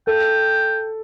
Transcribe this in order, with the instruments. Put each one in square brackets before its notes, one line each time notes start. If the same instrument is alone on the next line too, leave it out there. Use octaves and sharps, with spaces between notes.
[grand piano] A4 [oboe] G5